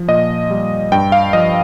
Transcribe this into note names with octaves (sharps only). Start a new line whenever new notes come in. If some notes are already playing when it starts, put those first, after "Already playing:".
Already playing: F3
A#2 D#5
G3
G2 G5
F5
F3 D#5